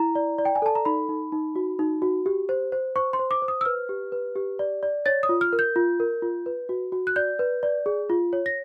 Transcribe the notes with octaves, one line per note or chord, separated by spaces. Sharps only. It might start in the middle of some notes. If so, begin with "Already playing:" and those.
Already playing: E4 A#5
D5
D5
G5
G#5
A4 A5
A#5
D#4 B5
D#4
D#4
F#4
D#4
F#4
G4
C5
C5
C5 C#6
C6
C5
D6
C5
D#6
E6
B4 F6
G4
B4
G4
D5
D5
C#5 A6
D#6
F4
F6
A#4
G6
F4
A#4
F4
B4
F#4
F#4
F#6
D5 G6
B4
D5
G#4
F4
C#5
A#6